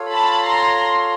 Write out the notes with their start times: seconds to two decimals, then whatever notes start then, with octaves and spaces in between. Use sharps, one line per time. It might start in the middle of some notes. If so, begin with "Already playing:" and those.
Already playing: F4 A4 C#5 F5
0.11 A5 B5
0.47 A#5 C6